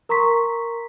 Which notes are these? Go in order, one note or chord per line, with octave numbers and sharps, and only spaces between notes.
A#4 A#5 C6 C#6 B6